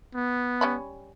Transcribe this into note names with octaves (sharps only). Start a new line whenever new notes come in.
B3
G3 C#4 B5